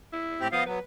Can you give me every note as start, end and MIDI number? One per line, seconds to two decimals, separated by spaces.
0.13 0.46 64
0.40 0.48 45
0.40 0.48 60
0.40 0.48 67
0.52 0.65 53
0.52 0.64 59
0.52 0.64 75
0.52 0.64 77
0.66 0.79 54
0.66 0.79 59
0.66 0.81 71